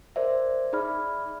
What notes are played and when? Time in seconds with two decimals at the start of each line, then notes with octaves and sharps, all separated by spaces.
0.16 A#4 C5 D5 E5
0.73 D#4 G#4 D5 E5 B5 F6